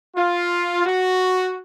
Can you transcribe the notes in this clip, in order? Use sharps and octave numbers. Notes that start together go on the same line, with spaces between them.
F4
F#4